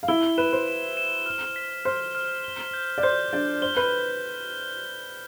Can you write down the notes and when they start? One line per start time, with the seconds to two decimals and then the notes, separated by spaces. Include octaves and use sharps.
0.03 F5
0.08 E4 E5 G7
0.38 B4 E7
0.53 C5
0.68 E7
0.97 E7
1.26 F6
1.56 B6
1.85 C5 F6
2.15 F6
2.44 G7
2.74 G6
2.98 D5
3.03 C5 G6
3.32 D4 D5 G6
3.62 C5 G7
3.77 B4